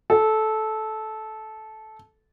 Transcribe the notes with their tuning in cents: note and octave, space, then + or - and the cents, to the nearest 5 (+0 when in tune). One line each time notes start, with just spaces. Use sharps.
A4 -15